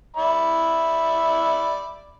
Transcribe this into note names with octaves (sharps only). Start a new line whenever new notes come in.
D5 E5 B5